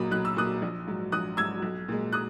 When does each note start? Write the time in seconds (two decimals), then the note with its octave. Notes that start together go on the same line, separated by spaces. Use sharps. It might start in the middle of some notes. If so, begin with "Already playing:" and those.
Already playing: B1 A#2 F#3 B5 D#6
0.11 B1 F#6
0.25 E6
0.36 A#2 F#3 D#6 F#6
0.62 A#1
0.87 G#2 F#3
1.12 A#1 D#6 F#6
1.37 G#2 F#3 E6 G#6
1.62 B1
1.88 A#2 G#3
2.12 D#6 F#6